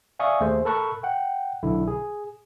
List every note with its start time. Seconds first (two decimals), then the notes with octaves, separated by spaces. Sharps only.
0.19 D5 E5 F5 G#5 C#6 D#6
0.40 D#2 A3 G#4 C5
0.65 A4 A#4 A5 B5 C#6 F#6
1.03 F#5 G5
1.63 B1 D3 E4
1.87 G#4